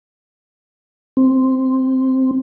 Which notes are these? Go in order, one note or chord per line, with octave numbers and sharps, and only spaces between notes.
C4